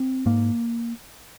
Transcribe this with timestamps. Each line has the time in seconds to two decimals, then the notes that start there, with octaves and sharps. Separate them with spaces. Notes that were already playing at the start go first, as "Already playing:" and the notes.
Already playing: C4
0.26 G#2 A#3